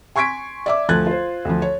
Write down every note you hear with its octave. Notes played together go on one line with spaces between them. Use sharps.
G#5 C6 C#6 G#6 B6 D7
D5 E5 D6
D2 F3 A3 F#6 G#6 A6
F4 C5
D2 F3
C#5